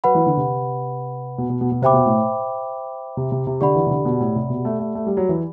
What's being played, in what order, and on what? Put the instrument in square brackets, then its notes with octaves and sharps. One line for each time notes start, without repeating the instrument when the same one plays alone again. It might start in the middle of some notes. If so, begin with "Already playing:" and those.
[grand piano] F#3 [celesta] B4 F#5 B5
[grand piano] E3
D3
C3
B2
B2
B2
B2
[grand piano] C3 [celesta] C5 E5 G5 B5 D6
[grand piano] B2
A2
C3
C3
C3
[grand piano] D3 [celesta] G4 D5 F#5 B5
[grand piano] E3
C3
D3
B2
A2
C3
B2
A3
A3
A3
G3
F#3
E3